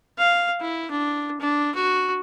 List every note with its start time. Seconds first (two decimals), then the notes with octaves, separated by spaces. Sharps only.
0.18 F5
0.61 E4
0.91 D4
1.41 D4
1.75 F#4